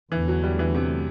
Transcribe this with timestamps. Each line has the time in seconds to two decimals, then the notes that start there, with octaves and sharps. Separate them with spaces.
0.12 E2 D3 E3 A3
0.28 F#3
0.44 G3
0.59 E3
0.74 C3